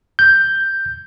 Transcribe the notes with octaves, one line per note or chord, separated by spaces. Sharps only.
G6